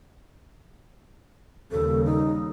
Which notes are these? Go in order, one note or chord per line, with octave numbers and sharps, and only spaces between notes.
D#2 C#3 G3 A4
D#4